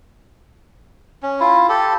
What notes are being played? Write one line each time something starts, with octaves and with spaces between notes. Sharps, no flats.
C#4
E4 F4
G4 A4